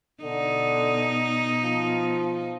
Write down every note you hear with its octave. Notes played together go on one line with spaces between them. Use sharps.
B2 D3 D#4
F3